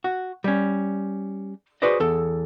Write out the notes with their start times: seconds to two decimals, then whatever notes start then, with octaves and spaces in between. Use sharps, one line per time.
0.04 F#4
0.44 G3 C#4
1.82 F#4 G#4 B4 C5 D5 D#5
2.00 E2 A4